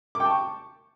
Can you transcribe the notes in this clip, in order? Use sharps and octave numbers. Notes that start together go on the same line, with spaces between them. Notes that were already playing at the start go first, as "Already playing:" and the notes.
D6
G5
A5
C#6